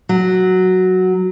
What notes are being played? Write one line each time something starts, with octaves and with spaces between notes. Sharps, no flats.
F#3